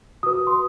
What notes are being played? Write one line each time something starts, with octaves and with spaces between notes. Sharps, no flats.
F#4 B4 D#6
C6